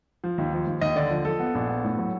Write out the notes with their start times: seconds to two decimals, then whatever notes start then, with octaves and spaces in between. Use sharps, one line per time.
0.24 F3
0.38 D#2
0.53 F3
0.67 D#2
0.81 D#2 D#5
0.96 D3 D5
1.11 F3
1.25 F3 A4
1.40 B3
1.55 A#1
1.70 B3
1.84 A2
1.98 F#3